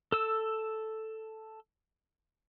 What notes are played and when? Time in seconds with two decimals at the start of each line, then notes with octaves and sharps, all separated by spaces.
0.12 A4 E6